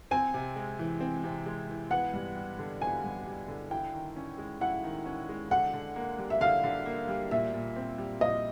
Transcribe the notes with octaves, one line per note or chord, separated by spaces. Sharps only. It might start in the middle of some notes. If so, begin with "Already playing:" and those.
C4 G#5
C3
G#3
E3
C4
C3
G#3
E3
B3 F#5
G2
G3
D3
B3 G#5
G2
G3
D3
E4 G5
D#3
C#4
G#3
E4 F#5
D#3
C#4
G#3
D3 F#5
D3
A#3
G3
E5
D3 F5
D3
A#3
G3
A#2 E5
A#2
C4
G3
A#2 D#5